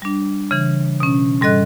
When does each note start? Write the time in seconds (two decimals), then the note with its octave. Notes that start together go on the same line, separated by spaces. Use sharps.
0.02 G3 D4
0.51 C#3 E3
1.00 B2 C#4
1.41 G#2 G3 A4 D#5 F#6